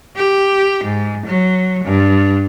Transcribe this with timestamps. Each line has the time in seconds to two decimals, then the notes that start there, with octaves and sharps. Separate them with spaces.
0.16 G4
0.84 G#2
1.27 F#3
1.85 G2